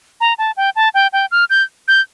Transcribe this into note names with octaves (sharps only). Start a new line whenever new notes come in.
A#5
A5
G5
A5
G5
G5
F6
G6
G6